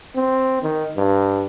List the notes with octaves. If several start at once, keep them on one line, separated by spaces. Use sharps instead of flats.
C4
D#3
G2